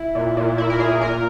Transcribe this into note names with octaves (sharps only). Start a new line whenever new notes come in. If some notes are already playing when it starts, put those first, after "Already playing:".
Already playing: E4
A#2
A#2
A#2 E4
A#4
A#2 G#4
A#2 A#4